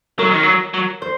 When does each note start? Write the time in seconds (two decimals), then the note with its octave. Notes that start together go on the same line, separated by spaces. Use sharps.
0.18 F#3 A#4
0.31 D#3
0.43 F#3
0.74 F#3
1.02 C5